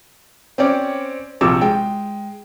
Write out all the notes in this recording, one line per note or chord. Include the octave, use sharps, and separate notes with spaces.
C4 C#4 C#5 D5
A#1 C3 D6 E6
G#3 G5